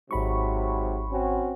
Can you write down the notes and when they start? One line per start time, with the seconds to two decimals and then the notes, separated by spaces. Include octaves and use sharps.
0.11 G#1 G#2 C3 F#3 B5 C#6
1.12 C4 C#4 F#4